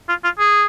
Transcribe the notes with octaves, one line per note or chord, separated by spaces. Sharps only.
F4
F4
G#4